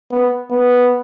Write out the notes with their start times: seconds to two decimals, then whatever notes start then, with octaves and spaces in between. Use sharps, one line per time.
0.11 B3
0.51 B3